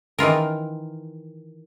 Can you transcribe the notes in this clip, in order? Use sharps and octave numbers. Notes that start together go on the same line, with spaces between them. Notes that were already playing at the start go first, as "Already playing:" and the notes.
D#3 E3 F4 A#4